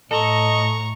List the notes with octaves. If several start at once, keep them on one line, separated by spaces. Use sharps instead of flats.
A2 A4 D#5 A#5 C#6